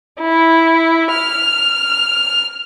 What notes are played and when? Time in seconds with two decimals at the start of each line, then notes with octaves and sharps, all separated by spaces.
0.20 E4
1.10 F6